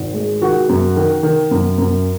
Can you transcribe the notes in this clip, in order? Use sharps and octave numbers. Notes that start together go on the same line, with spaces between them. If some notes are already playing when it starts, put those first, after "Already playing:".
Already playing: G#1
G#3
D#3 F#4
F#2
D#3
D#3
F#2
F#2